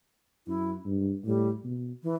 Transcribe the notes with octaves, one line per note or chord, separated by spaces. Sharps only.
F#2 E4
G2
A2 G3
B2
E3